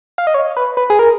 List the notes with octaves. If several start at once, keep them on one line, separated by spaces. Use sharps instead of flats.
F5
D#5
C#5
B4
B4
G#4
A#4